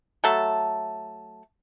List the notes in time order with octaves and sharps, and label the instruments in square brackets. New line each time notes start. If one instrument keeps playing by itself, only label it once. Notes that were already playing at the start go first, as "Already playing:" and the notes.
[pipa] F#3 A3 A4